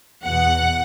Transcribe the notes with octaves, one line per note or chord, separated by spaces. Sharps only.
E2 B2 F#5